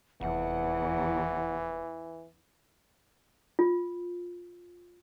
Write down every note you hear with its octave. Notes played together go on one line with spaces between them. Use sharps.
F1 E2 E3 F#5
F4